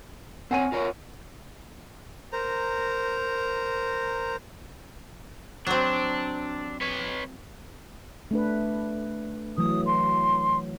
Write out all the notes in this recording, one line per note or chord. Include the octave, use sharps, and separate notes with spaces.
C4 C#5 F#5 G#5 D#7
F4 A#4 C#5
A#4 C5 A#5
F#3 C4 D4
B4 C#5
A3 D4 B4
E3 F#3 A3 D#6
C6